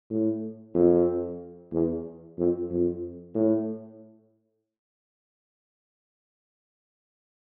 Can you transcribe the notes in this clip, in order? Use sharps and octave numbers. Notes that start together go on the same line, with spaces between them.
A2
F2
E2
F2
F2
A2